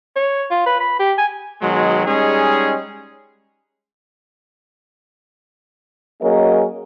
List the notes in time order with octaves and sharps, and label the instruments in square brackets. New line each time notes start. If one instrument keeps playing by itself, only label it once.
[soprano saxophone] C#5
F4
B4
B5
G4
G#5
[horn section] B2 D#3 F#3 G#3
G3 G#3 C#4 D#4 G#4
[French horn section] F#3 A#3 C#4 G#4 A#4 D#5